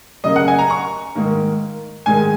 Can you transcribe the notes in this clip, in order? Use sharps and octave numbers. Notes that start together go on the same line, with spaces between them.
F#2 C#3 A#3 D#5
F#5
G#5
A#5
C#6
G#2 D#3 A#3
G#2 D#3 G#3 G#5